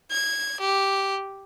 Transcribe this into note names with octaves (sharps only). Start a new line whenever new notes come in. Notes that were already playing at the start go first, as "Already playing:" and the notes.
G#6
G4